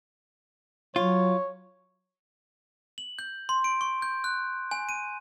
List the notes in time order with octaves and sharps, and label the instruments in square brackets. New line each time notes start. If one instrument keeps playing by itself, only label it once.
[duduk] F#3 [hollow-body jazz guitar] F4 [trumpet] C#5
[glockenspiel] F#7
G6
C6
D7
C#6
G6
F#6
G#5
D#7